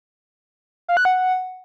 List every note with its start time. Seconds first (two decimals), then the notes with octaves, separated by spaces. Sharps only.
0.88 F5
0.97 F#6
1.05 F#5